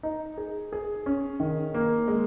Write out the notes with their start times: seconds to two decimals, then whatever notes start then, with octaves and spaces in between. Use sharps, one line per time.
0.03 D#4
0.38 G#4
0.73 G#4
1.06 C#4
1.40 D#3
1.74 A#3
2.08 G#3